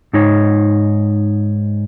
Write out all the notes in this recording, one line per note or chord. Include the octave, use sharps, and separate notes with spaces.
G#2 D#4 C#5